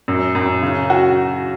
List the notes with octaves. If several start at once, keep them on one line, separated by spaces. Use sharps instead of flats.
F#2
F#2
C#3
F#4